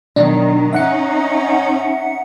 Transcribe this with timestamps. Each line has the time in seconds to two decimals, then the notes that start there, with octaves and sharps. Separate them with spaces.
0.16 B2 D#3 F#3 D4
0.73 C#4 D#4 E5 F#5 C#7